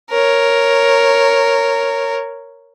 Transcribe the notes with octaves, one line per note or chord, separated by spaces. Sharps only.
A#4 C#5